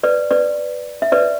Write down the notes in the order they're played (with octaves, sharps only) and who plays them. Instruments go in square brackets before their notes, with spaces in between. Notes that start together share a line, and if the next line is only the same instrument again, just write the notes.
[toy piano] B4 D5
B4 D5
E5
B4 D5